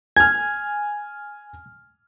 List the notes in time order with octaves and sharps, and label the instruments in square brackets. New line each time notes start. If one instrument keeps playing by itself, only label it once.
[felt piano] G#5 F6 [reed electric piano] G#6